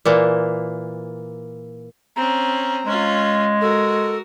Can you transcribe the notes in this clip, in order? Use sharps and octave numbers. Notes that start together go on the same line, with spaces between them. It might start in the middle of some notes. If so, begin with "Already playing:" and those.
A#2 E3 A#3
C4 C#4 A#5
G#3 C#4 F4
F#4 A4 A#4